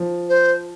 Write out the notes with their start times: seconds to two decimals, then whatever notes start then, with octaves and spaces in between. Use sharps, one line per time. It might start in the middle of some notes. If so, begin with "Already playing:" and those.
Already playing: F3
0.29 C5